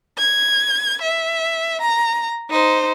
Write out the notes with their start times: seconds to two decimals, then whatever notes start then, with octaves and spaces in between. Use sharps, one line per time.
0.18 G#6
1.02 E5
1.81 A#5
2.50 D#4 C5